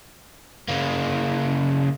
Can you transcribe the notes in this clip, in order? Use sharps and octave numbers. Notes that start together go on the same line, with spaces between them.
C#3 A#3